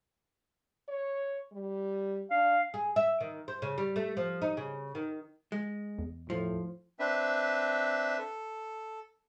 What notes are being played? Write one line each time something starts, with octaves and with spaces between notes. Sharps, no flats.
C#5
G3
D4 F5
G#4
E5
D#3
C5
C#3
G3
A3
F3
D#4
C#3
D#3
G#3
E2
A2 F3
C4 D4 B4 E5
A4